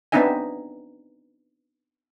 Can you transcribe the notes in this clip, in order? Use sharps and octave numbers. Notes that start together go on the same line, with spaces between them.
B3 C4 D4 D#4 E5 G#5